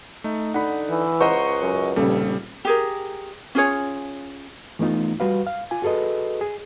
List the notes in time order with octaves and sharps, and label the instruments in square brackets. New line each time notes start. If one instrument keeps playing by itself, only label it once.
[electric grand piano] A3 [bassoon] D#4
[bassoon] D3 [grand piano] D#4 B5 [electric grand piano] F#5
[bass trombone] E3
[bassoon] C#2 [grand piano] C5 A#5 [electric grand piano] D#5 F#5 C#6
[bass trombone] F#2
[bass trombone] F1 [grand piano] A#1 C#3 A4 [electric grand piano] G3
[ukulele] G4 G#4 A#4
C#4 F4 G#4 C#5
[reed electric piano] E3 A3 B3 D#4 F4
G3 F#4 B4 F5
F5
F4 G#5
F#4 G#4 A4 B4 D#5
G#4